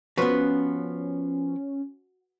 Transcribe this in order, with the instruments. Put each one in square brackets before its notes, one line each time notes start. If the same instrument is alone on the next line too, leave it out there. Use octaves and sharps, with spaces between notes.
[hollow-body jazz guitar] F3 B3 [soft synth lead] C#4 [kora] F#4 B4